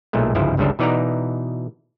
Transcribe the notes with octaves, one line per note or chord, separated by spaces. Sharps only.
B1 A#2 G#3 A3
G1 C#2 G#2 F3 E4
G1 C#2 G2 C#3 D4 A4
B2 E3 D#4 D5 F#5 A#5